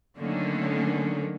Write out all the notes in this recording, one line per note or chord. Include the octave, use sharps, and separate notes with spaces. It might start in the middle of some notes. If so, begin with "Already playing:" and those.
D3 D#3 F#3 A3 A#3 C#4